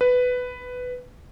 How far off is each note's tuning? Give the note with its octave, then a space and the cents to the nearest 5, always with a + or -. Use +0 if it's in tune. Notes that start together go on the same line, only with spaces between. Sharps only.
B4 +10